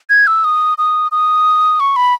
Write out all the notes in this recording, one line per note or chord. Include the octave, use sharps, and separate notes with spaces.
G#6
E6
D#6
D#6
D#6
C#6
B5